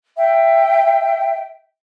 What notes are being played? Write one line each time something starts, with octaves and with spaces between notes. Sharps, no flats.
E5 G5